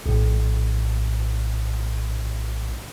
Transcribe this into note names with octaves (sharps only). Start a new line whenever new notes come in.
A#1 A2